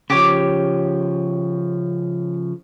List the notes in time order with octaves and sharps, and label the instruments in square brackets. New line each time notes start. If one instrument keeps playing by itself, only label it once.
[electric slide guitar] C#3 F3 [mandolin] G4 C#5